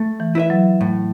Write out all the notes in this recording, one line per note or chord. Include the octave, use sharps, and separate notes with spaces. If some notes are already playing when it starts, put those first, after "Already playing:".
Already playing: A3
E3
E4 B4 E5
F#3
A2